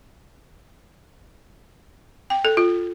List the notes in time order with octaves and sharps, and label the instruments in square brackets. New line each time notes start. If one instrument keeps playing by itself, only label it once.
[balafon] G5
A4
F4